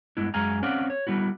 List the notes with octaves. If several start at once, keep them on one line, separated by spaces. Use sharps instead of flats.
G2 G#3 B3 E4
F#2 G#3 G#4 F5 G#5 A#5
C4 C#4 D5 F5 F#5
C#5
G3 B3 E4 F#4